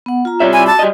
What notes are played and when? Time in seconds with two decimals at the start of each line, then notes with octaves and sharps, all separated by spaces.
0.06 B3 F#5
0.25 F4 A#5
0.40 C3 G3 F4 C#5 E5
0.53 G#5 B5 D6 E6
0.67 F#4 A5
0.79 G3 D#5